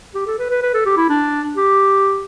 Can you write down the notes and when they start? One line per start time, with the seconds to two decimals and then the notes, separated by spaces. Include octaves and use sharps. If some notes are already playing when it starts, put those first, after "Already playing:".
0.15 G4
0.27 A4
0.39 B4
0.50 B4
0.62 B4
0.74 A4
0.86 G4
0.97 E4
1.09 D4
1.57 G4